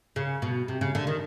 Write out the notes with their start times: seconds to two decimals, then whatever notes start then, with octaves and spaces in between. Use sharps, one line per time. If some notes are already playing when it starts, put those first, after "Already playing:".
0.16 C#3
0.42 B2
0.68 C3
0.81 C#3
0.95 D3
1.07 D#3